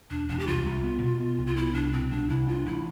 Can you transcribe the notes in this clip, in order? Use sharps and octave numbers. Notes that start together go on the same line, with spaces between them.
E1 D4
E1 D4
G4
C2 F4
C2
B3
B2
B3
C2
F4
B3 E4
C2 D4
B2 C4
C2 D4
C2 E4
D4 F4
A1 E4